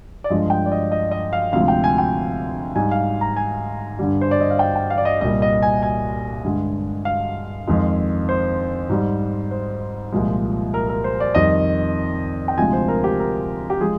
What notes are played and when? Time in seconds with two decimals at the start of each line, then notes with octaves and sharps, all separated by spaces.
0.24 D5
0.30 G2 F3 G#3 D#5
0.50 G5
0.66 D5
0.72 D#5
0.92 D#5
1.11 D#5
1.33 F5
1.52 D2 C3 F3 G#3 F5
1.68 G5
1.84 G#5
1.98 G5
2.76 G#2 G3 G#5
2.91 F5
3.21 A#5
3.36 G#5
3.99 G2 D3 G3
4.21 C5
4.31 D5
4.41 D#5
4.50 F5
4.59 G5
4.76 G5
4.90 F5
4.98 D5
5.05 D#5
5.21 C2 A#2 G3 D#5
5.42 D#5
5.62 G#5
5.82 G#5
6.44 G2 D3 G#3
7.05 F5
7.67 F2 D#3 G#3
8.29 C5
8.89 G#2 G3
9.51 C5
10.12 C2 A#2 F3 G#3
10.74 A#4
10.89 A#4
11.04 C5
11.20 D5
11.35 F2 D#3 G3 D#5
12.48 G5
12.57 D2 C3 F3 G#3 G#5
12.73 C5
12.88 A#4
13.04 G4
13.20 A#4
13.70 G4
13.80 F3 G#3 G#4